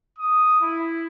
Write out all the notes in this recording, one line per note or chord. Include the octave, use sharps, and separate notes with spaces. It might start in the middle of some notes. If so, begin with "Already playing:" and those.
D#6
E4